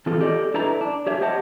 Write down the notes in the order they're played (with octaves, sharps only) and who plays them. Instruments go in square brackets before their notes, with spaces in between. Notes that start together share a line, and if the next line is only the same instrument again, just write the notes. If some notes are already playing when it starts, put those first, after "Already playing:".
[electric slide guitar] E3 C4 F4 A4
G4 A4 D5 D#5
D4 E4 A4 B4 D5 A#5
D4
G4 C#5 E5
G4 C5 D#5 F#5 A5